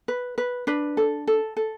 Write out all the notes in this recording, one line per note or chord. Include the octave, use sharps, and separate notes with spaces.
B4
B4
D4 B4
A4
A4
A4